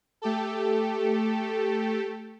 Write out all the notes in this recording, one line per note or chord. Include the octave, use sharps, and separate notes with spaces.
A3 G4 A4